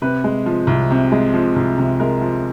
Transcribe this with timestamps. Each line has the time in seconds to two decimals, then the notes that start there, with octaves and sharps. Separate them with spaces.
0.02 C3 B4
0.24 G#3
0.46 F3
0.67 C2
0.90 C3
1.12 G#3
1.34 F3
1.56 C2
1.78 C3
2.00 G#3 A#4
2.22 F3